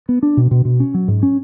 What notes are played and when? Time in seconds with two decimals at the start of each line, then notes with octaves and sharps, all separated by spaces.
0.09 B3
0.23 D4
0.37 B2
0.51 B2
0.65 B2
0.80 C#4
0.94 F#3
1.08 G#2
1.23 C#4